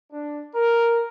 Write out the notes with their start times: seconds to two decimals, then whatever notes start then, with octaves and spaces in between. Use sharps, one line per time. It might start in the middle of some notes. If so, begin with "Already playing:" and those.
0.11 D4
0.54 A#4